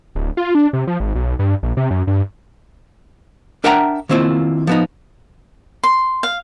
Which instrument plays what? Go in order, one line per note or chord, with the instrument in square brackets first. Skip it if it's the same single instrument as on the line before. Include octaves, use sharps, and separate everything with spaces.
[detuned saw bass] D1
F4
D4
C3
F3
G#1
B1
G2
A#1
C3
F#2
G2
[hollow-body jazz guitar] D4 A#4 E5 F#5 G5 A#5
D#3 A#3 C4 E4 F4
F3 B3 D#4
[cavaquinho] C6
F5